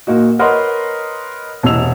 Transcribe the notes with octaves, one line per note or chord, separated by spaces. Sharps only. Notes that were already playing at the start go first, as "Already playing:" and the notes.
A#2 A#3 D#4 F#4
A#4 B4 C#5 D#5 F#5 C6
E1 C3 D#5 E6 F7